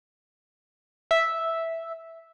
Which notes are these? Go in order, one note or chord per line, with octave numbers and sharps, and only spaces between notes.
E5